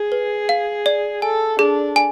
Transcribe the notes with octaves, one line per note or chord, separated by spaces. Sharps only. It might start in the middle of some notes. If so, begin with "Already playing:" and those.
Already playing: G#4
B4
F5
D5
A4 G#5
D4 G#4
G#5